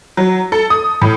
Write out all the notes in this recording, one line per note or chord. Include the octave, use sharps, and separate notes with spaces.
F#3
A4
D#6
A2